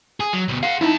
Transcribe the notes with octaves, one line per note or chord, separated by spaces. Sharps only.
G#4
F#3
D2 B2
G#4 F5 F#5
F2 D#4 E4 A5